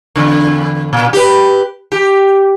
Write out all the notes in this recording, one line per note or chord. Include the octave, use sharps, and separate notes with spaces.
E2 D3
A#2
G4 B4
G4